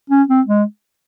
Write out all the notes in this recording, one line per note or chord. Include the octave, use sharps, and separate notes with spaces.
C#4
C4
G#3